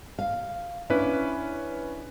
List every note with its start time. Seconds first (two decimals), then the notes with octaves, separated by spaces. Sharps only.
0.19 F5
0.90 C#4 D4 E4 B4